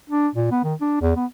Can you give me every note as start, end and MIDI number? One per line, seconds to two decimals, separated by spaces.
0.09 0.28 62
0.35 0.48 46
0.51 0.60 59
0.64 0.74 51
0.81 1.00 62
1.01 1.13 40
1.16 1.26 59